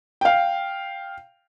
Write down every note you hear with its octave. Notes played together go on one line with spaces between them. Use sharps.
F5 G5